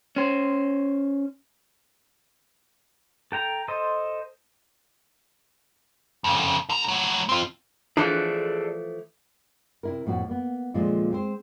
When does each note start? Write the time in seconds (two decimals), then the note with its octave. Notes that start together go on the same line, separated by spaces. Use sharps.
0.16 C#4 C5
3.32 A4 G5 A#5
3.68 A4 C5 D#5
6.24 F2 C#3
6.70 D3 A#5
6.88 F#3 A3
7.29 C4 F4
7.97 E3 F3 A3 D4 G#4 A4 D5
9.83 C3 E4 A#4
10.06 F2 A2 A#3 F#4
10.28 A#3 B3
10.74 D#2 A#2 D3 F3 G#3 F4
11.11 G#3 C4 C5